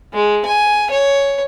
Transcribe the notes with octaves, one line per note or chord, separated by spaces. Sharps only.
G#3
G#5
C#5